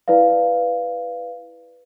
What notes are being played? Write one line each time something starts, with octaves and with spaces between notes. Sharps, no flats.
E4 B4 D5 F5